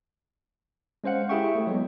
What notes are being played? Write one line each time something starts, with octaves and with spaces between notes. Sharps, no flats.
G#3 C#4 C5 F5 F#5
E4 G4 G#4 E5 G5 C#6
A3
F#3 G#3 B3